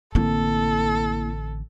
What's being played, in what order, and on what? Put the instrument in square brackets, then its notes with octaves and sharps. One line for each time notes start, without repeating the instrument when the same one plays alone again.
[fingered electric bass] A1 D3 C4 [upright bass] A#3 E4 [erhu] A4